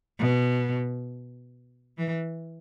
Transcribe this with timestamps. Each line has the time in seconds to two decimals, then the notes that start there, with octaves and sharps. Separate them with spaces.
0.19 B2
1.98 E3